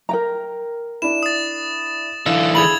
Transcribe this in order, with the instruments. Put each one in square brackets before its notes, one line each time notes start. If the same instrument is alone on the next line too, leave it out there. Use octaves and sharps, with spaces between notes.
[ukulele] A#4 G5 A#5
[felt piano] D4 E4 [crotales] E7
[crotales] D#6 A6
[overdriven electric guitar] D3 E3 [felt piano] F5 [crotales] E6
[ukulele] G#4 B5 [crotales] G#6 F7 F#7